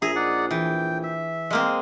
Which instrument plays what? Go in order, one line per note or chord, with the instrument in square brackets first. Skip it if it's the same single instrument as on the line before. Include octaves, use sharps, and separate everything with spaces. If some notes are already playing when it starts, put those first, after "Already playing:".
[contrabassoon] A#1 [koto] G#4 [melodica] E5 A#5
[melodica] D#4 D5 F#5
[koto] E3 [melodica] G5
[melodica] E5
[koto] G#3 A#3 C4